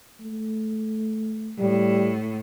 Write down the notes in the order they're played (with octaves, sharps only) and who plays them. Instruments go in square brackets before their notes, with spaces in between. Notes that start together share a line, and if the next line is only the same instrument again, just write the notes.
[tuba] A3
[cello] A2 [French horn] G3